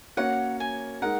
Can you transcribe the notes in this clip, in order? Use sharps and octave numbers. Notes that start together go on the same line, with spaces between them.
A#3 C#4 F#4 A#4 C#5 F#5
G#5
G#3 D#4 A#4 F#5